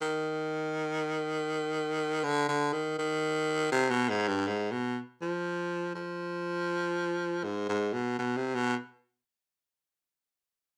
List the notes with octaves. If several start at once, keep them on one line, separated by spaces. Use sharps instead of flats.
D#3
D3
D3
D#3
D#3
C3
B2
G#2
G2
G#2
B2
F3
F3
G#2
G#2
B2
B2
C3
B2